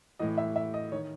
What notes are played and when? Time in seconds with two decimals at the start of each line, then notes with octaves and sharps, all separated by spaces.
0.19 A2 E3 D#5
0.38 E5
0.56 E5
0.74 D#5
0.92 D#3 C#5